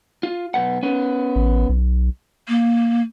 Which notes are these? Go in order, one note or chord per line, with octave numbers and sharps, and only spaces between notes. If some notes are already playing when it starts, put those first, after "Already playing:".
F4
B1 B3 F#5
B3 C#4
A1
B1
A#3